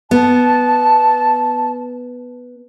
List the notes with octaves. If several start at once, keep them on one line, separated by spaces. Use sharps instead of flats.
B3 A5